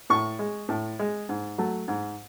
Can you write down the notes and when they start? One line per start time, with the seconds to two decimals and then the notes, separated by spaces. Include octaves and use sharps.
0.10 A2 C#6
0.39 G#3
0.69 A2
0.99 G#3
1.29 G#2
1.58 F#3 A3
1.88 G#2